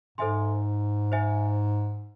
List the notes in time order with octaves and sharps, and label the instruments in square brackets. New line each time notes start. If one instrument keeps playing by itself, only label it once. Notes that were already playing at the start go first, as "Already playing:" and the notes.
[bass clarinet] G#2 [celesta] A4 C5 E5 G#5 C6
[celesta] C5 E5 G#5